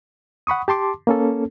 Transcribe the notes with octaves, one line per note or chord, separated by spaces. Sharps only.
F#5 B5 C#6 D#6
G4 A5 C6 D6
A#3 C#4 A4